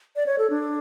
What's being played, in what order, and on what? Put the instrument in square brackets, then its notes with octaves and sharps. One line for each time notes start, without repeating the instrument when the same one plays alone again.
[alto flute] D5
C#5
A4
D4